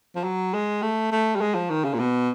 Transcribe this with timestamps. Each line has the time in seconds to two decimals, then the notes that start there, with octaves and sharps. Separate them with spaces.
0.16 F3
0.24 F#3
0.54 G#3
0.83 A3
1.12 A3
1.36 G3
1.41 G#3
1.55 F3
1.70 D#3
1.85 C#3
1.94 A#2
2.00 B2